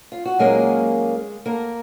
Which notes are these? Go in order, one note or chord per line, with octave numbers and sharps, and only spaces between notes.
F4
F#4
A#2 F#3 G#3 A#3 C#4 G#4
A#3 A#4